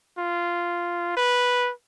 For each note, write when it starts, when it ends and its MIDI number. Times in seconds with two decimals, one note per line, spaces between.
0.18 1.12 65
1.17 1.71 71